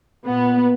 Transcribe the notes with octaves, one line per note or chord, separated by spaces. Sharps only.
A#2 B3